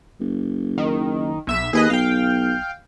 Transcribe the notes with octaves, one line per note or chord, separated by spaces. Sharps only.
F#1
D#3
B1 E5 E7
D#2 G#4 B4 D#5
B1 F5 G5